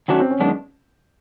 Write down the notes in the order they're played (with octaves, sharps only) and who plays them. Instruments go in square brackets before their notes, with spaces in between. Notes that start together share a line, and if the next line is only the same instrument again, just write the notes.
[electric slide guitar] D#3 F#3 A3 D4 F#4 [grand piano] C#4
[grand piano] C4
C#4
[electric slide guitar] F#2 D#3 G#3 B3 D4